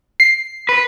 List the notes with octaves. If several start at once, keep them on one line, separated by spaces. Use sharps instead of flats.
C7
B4